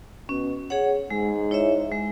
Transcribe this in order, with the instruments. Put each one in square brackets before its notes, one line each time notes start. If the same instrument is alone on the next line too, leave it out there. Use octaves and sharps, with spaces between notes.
[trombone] B2 [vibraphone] C#4
[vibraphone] G#4 C#5 F#5
[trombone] G#2 [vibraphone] G#3
[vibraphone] E4 C#5 E5
G#3